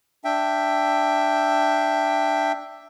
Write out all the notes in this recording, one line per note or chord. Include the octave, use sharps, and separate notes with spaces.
D4 E5 G5